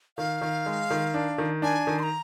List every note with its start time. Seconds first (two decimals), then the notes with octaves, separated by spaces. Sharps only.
0.17 D#3 F5
0.42 D#3
0.66 G#3
0.91 D#3
1.14 D4
1.38 D#3
1.62 D4 G#5
1.87 D#3
1.99 C6
2.03 A#5